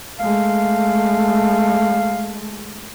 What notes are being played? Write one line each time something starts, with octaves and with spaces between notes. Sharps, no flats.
G#3 A3 F5